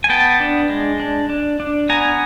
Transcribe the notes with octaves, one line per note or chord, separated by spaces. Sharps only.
G#5
B3 G5 A5
D4
G#3
D4
D4
D4
B3 G#5 A#5